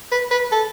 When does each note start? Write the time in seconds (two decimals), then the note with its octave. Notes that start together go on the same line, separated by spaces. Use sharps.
0.11 B4
0.31 B4
0.51 A4